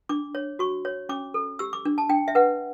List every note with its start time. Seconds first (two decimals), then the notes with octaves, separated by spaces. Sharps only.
0.09 D4 D6
0.35 C#5
0.59 F#4 C#6
0.85 C#5
1.09 C#4 D6
1.34 A4
1.59 G4 E6
1.73 D6
1.85 D4
1.98 A5
2.09 D4 G5
2.28 E5
2.35 B4 F#5